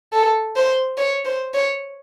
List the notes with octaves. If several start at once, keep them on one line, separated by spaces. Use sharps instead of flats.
A4
C5
C#5
C5
C#5